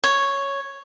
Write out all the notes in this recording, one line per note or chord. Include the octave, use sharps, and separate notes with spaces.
C#5